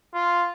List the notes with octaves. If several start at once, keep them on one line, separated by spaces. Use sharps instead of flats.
F4